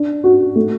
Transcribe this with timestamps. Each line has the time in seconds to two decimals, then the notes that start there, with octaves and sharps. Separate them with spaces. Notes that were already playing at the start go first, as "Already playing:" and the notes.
Already playing: D4
0.24 F#4
0.56 A3